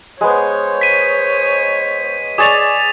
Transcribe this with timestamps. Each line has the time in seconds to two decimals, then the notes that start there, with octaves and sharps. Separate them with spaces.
0.21 G#3 B3 C5 C#5
0.81 B6 D#7
2.38 G#4 C#5 D5 D6 A6 F7